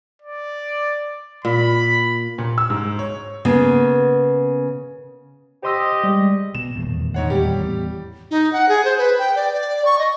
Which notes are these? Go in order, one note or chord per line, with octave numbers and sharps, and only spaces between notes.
D5
A#2 B5
A#2
E6
G#2
C#5
C#3 A#3 B3
G4 C5 D#5 C6 E6
G3 G#3
B2 E7
D#1 E2 A2
G#2 C#5 F#5
G3 G4
E2 A2 E3
D#4
F#5
G#4
C5
B4
G5
D5
D5
C#6
D#5